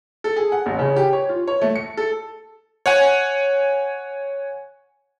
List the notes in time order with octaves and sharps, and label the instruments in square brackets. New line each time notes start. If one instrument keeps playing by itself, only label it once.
[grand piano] A4
G#4
F#5
A1
C#3
G4
C#5
F4
C#5
A3
C#7
A4
[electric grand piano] C#5 F#5 G#5